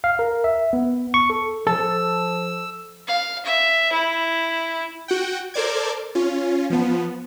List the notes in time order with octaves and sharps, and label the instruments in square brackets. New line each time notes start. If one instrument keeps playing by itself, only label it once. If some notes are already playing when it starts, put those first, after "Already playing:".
[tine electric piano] F5
A#4
E5
B3
C#6
A4
[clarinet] F3 [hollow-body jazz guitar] A4 A5 [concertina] E6
[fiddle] F5
E5
E4
[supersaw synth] F#4 F#5 G5
A4 A#4 C5 D5 D6 G#6
C#4 F4
F3 B3